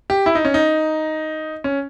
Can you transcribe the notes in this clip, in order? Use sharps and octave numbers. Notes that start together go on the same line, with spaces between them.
G4
E4
D#4
C#4
D#4
C#4